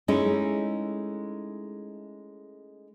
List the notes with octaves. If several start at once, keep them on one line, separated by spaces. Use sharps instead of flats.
G#3 A3 C#4 D#4 E4